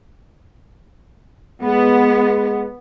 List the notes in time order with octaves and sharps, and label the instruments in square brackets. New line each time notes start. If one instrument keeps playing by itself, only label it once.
[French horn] G#3 [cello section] B3